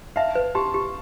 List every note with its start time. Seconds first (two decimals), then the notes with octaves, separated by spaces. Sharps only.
0.16 E5 F5 A5
0.35 B4
0.55 G4 A5 C6
0.74 G4